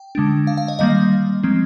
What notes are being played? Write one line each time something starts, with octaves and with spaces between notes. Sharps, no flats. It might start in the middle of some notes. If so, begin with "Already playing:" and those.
Already playing: G5
D3 G#3 D4
F5
F5
D#5
D#3 G3 A#3 D#5
F3 G#3 C4